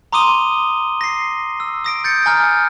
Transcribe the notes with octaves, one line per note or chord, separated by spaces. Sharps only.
A#5 C6 D6 D#6 D#7 G7
A#6 C7
E6
D#6 A#6 D7
G6 A6 C#7
G#5 A#5 F6